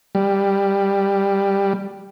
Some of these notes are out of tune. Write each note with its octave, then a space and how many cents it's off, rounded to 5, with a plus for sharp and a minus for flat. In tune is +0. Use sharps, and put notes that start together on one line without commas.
G3 +10